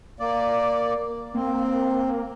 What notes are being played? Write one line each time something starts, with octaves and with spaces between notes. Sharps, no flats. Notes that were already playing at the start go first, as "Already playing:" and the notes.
A#3 D5
A#3 C4